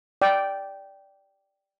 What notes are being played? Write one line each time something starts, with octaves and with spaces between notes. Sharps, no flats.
D5 G5